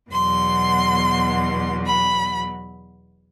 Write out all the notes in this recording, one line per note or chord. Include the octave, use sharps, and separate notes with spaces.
E2 B2 F#3 C6
B5